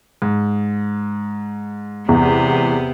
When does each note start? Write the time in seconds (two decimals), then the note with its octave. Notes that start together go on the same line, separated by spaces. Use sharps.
0.22 G#2
2.09 E2 C3 B3